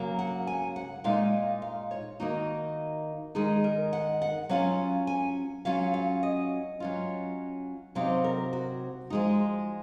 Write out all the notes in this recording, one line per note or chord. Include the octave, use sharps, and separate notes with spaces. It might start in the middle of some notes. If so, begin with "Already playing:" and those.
Already playing: C#3 F#3 A#3
F#5
G#5
F#5
A#2 G#3 D#4 F5
F5
C#5
D#3 A#3 D#4 F#4
D#3 G#3 D#4 G#4
A#4
F#5
F#5
F#3 C#4 F4 F5
G#5
F#3 C#4 F4 F5
F5
D#5
F#3 C#4 F4
C3 F#3 C4 D#4 F5
A#4
F#4
F3 G#3 D#4